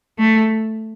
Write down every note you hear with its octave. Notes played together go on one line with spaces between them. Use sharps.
A3